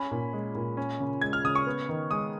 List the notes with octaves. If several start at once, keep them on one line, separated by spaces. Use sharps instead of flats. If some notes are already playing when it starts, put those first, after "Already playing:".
Already playing: C#4 B5
A#2
G#3
A#2
C#4
C#3
G#3 G#6
F6
C#3 D#6
C#6
B3
D#3
G#3 D#6